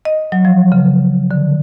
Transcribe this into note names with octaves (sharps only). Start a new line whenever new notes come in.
D#5
F#3
F3
C#3
D3